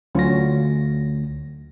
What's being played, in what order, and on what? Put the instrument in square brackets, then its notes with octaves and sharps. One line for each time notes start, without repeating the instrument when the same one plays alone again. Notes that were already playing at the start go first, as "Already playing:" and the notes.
[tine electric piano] D2 A#6 [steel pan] F#3 C#4 F4